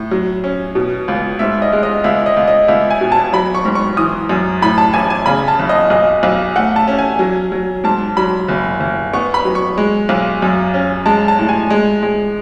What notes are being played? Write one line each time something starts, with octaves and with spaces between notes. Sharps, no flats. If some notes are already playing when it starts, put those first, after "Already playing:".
Already playing: A2
F#3
C#4
B2
C#2
G#2 E5
D#5
G#3
D#5
C#2 E5
D#5
C#2
D#5
C#2 E5
G#5
B2
A5
F#3 B5
C#6
G#2
C#6
E3 D#6
F#2
A2 B5
A5
A1 G#5
G#5
C#3 B5
A5
F#1
D#5
B1 D#5
B1
A3 F#5
A5
C#4
G#5
F#3
F#3
G#2 A5
F#3 B5
F#1
F#1
B3 C#6
B5
F#3
C#6
G#3
B1
F#2
C#4
G#3 A5
A5
A2
G#5
G#3
G#3